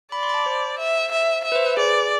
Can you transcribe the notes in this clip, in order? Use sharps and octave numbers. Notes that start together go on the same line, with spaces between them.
D5 B5
C6
B5
A5
C5
E5
E5
E5
B4
C5
B4
G#4 D5